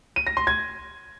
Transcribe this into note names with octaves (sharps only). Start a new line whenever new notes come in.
D#7
A#6
C6
G#6